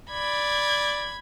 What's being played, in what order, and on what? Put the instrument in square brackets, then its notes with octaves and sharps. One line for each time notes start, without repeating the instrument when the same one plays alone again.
[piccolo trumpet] D5 [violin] B5 G#6